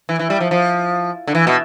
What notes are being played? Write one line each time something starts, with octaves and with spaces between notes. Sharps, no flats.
E3
E3
G3
F3
F3
D3
E3
B2